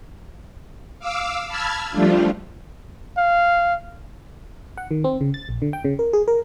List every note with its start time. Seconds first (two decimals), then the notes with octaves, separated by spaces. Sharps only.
0.99 F5 D6 E6
1.47 A5 B5 E6 F6 G#6
1.91 F3 G3 A3 D4 F4
3.17 F5
4.77 F#5
4.91 D#3
5.04 C4
5.21 C#3
5.34 A6
5.49 A#1
5.62 D3
5.73 G5
5.85 C#3
5.99 A#4
6.13 G#4
6.28 A#4